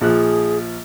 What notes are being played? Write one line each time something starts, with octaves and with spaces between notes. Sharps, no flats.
A#1 F3 G#4 F#6